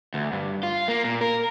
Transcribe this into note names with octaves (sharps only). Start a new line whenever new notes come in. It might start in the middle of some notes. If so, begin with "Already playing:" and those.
D2
G2
F4
A#3
A#2
A#4